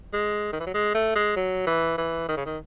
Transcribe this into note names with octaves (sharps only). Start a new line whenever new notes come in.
G#3
D#3
E3
F#3
G#3
A3
G#3
F#3
E3
E3
D#3
C#3
D#3